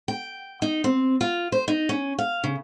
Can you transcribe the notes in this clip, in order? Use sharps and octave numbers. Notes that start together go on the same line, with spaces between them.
G5
D#4
C4
F4
C5
D#4
C#4
F5
C#3